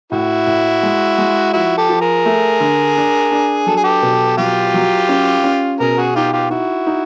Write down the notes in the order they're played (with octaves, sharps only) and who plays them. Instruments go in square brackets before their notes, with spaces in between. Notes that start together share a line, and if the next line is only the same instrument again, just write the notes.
[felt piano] A2 [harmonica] E4 F#4
[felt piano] A2
G#3
G#3
[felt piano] F3 [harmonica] E4 F#4
[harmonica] G4 A4
[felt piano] F3
[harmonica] G#4 A#4
[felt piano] A3
D3
D4
D4
[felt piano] F#3 [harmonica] A4
[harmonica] G#4
G4 A4
[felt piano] B2
[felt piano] F#3 [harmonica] F4 G4
[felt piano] F#3
C#4
C#4
[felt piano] B2 [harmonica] G#4 A#4
[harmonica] F#4 G#4
[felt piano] D#4 [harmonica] F4 G4
[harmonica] F4 G4
[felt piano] D#4 [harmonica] E4 F#4
[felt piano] D#4